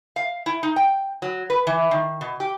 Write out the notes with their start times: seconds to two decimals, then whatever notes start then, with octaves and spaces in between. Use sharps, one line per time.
0.16 F5
0.46 E4
0.63 D#4
0.76 G5
1.22 F#3
1.50 B4
1.67 E3
1.91 D#3
2.21 B2
2.40 G4